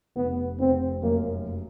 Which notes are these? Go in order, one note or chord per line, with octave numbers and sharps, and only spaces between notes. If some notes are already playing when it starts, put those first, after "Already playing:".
F1 B3
F1 C4
F#2 A#3